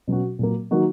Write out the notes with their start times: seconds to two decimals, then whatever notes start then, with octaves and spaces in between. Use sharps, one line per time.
0.07 B2 F#3 C#4 F#4
0.39 A#2 F#3 A#3
0.71 D#3 F#3 A#3 D#4 F#4